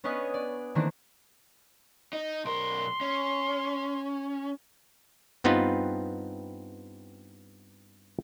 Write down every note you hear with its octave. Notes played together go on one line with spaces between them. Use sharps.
B3 C#4 D4 B4 D#5 G#5
D5
D#3 E3 A3 A#3 C4 D4
D#4
B1 A#4 C6
C#4
G2 B3 C4 D#4 F4 B4